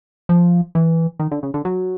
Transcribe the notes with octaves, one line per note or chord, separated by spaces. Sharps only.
F3
E3
D#3
D3
C#3
D3
F#3